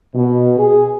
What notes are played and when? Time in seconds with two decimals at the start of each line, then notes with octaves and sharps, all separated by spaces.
0.15 B2
0.59 G#4